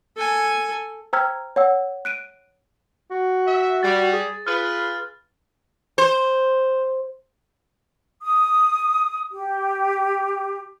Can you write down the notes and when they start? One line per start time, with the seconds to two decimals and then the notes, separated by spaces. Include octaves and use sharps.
0.17 A4 G#5
1.13 C5 G5 A#5 E6 F6 G#6
1.56 C#5 F#5 E6
2.05 F#6 D7 D#7
3.11 F#4
3.47 E5
3.83 G3 A6
4.12 G#4
4.47 F4 G#4 B4 F6
5.98 C5
8.21 D#6
9.31 G4